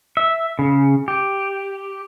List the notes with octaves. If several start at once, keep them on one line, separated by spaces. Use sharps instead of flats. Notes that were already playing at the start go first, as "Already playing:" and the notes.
E5
C#3
G4